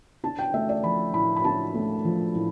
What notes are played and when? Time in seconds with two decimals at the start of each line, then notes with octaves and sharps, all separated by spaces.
0.23 D4 A5
0.39 G5
0.54 A3 E5
0.69 D5
0.84 F3 B5
1.14 A2 B5
1.36 B5
1.44 D4 A5
1.75 A3
2.05 F3
2.35 A2